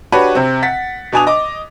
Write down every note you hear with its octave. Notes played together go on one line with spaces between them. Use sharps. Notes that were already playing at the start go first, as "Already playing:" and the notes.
D4 F#4 G4 B4 C#5
C3 C4
F#5 A6 B6
B2 D4 D5 G#5 D#6 F7
D#5 D6